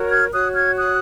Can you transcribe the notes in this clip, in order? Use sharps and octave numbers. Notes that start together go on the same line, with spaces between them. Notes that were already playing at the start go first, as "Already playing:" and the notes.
Already playing: F#4 A#4 C#5
F6 G#6
F#4 C#5 D#6 F#6
F6 G#6
D#6 F#6